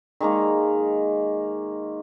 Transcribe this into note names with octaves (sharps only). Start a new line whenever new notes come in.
D#3 G#3 A#3 D#4